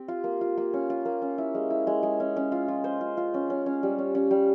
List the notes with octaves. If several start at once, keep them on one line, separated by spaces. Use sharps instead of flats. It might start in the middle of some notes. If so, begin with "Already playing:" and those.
Already playing: C4 G4
F4
A#3
F4
A#3
C#4
F4
A#3
C#4
E4
G#3
E4
G#3
G#3
C#4
C#4
F4
F4
C5
F4
F4
C#4
C#4
C#4
G3
C#4
C#4
G3